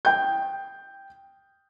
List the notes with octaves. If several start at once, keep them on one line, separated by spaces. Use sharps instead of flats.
G5 G6